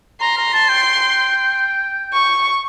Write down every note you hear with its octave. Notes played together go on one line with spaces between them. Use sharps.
A#5 C6
A#5
A5
G5
C#6